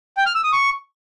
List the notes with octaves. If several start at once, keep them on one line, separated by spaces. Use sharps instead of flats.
G5
F6
E6
D#6
C#6